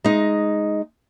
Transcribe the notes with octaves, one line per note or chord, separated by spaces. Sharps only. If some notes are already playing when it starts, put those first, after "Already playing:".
G#3 D#4